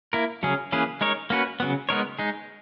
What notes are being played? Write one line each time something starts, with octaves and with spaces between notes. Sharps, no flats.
A#3 E4 A#4
C#3 F#3 C#4 G#4
E3 A#3 C#4 G#4 B4
G#3 D#4 A#4 C#5
A#3 C#4 F#4 B4
C#3 F#3 B3
G#3 B3 D#4 A#4 C#5
G#3 D#4 G#4